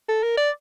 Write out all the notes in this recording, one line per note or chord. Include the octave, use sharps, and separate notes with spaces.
A4
A#4
D5